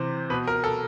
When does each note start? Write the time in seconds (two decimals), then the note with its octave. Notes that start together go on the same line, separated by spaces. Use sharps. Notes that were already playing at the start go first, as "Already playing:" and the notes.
Already playing: C3 E3 C5
0.30 B2 B4
0.47 A#4
0.64 A4